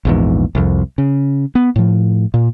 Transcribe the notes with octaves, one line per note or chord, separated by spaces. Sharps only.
A#1 E2 G#2
C2 F2
C#3
B3
A2 F3
A#2